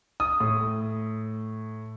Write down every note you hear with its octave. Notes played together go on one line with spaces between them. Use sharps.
D#6
A2